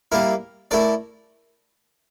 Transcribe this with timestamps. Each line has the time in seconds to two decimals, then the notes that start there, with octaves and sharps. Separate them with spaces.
0.12 G3 A#3 E4 A#4
0.71 A3 E4 A#4 D5